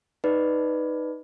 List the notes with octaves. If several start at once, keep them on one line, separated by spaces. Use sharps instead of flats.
D#4 B4 D5